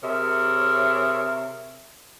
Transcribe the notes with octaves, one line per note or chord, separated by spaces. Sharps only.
C3 G#4 A#4 C#5 E5